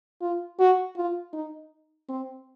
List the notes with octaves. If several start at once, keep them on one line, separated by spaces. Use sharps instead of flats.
F4
F#4
F4
D#4
C4